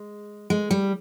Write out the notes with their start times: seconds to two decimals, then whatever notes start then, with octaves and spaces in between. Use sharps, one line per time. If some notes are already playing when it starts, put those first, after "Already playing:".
Already playing: G#3
0.50 G#3
0.71 G3